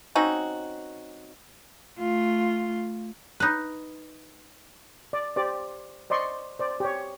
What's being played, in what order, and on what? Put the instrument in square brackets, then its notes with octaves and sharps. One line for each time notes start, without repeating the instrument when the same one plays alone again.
[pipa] C4 C#4 D#4 F#4
[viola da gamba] A3 F4
[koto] D#4 B4
[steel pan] D5
G4 C5 D5
C5 D5 D#5 C6 C#6
C5 D5
G4 C#5